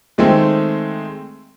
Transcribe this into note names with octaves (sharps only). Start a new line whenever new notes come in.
D#3 G#3 A3 C4